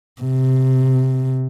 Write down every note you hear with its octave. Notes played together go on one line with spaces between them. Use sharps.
C3